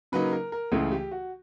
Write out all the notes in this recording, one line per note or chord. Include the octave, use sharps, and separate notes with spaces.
C#3 F#3 A#3 D#4 B4
A#4
A#4
C#2 C#3 E3 A3 G#4
G4
F#4